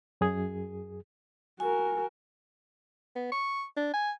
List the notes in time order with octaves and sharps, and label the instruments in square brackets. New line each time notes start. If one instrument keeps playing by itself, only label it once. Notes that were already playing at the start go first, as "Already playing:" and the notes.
[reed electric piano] F#2 G#4
[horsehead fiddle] F#4 A#4 [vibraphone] G#5
[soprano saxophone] B3
C#6
D4
G#5